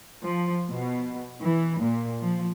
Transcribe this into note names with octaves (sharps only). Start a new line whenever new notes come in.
F3
B2
E3
A#2
F3